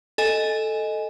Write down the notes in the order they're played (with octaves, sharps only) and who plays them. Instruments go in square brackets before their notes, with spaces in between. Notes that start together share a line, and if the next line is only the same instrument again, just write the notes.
[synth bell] A4 D#5 G#5